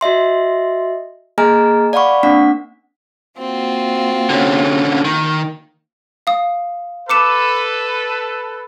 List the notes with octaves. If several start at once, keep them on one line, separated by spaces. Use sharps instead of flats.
F#4 D#5 E5 C6
A#3 G#4 D#5 G#5 A#5 F6
D5 F5 F#5 B5 C#6
A#3 C4 D4 F#5 B6
A#3 C4 F4 F#4
D3 C#4
D#3
F5 D#6
A4 B4 D6 C#7 E7